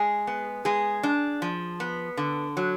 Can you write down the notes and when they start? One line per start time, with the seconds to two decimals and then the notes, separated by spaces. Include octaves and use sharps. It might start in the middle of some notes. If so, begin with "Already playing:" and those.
Already playing: G#3 G#4
0.27 B3
0.65 G#3 G#4
1.03 D4
1.42 F3
1.80 B3
2.17 D3
2.57 F#3